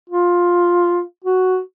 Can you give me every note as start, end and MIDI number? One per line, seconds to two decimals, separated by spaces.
0.09 1.02 65
1.24 1.59 66